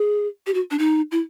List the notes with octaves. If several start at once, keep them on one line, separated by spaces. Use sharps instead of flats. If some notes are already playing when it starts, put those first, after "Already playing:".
Already playing: G#4
G4
F#4
D4
D#4
E4